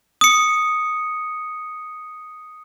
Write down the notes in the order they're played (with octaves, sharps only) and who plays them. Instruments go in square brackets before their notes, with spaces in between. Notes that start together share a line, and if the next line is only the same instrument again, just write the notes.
[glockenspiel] D#6 C#7